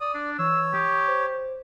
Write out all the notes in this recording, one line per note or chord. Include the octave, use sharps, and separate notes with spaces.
D5 D#6
D4
E3 C#5 E6
G4 D#6
C5